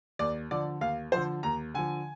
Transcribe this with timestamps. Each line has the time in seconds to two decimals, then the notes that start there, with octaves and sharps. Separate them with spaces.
0.19 D#2 D5
0.51 D3 F3 D5
0.81 D#2 F5
1.12 D3 F3 C5
1.43 D#2 A#5
1.74 D3 F3 G#5